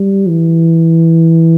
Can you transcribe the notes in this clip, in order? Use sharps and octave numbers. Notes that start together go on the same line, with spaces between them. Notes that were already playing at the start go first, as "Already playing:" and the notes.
Already playing: G3
E3